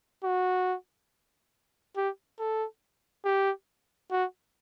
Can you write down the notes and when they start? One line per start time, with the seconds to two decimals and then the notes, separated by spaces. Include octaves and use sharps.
0.24 F#4
1.96 G4
2.39 A4
3.25 G4
4.11 F#4